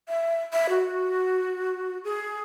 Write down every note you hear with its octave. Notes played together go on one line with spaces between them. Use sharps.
E5
E5
F#4
G#4